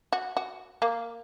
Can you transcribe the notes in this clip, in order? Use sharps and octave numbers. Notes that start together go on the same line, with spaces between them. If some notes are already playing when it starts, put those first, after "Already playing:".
F#4
F#4
A#3